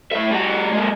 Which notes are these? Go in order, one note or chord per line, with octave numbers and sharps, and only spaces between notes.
A2 E5
G3 F#4
G#3 A#3